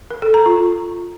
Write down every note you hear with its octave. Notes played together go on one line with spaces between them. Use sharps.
A#4
A4
A#5
F4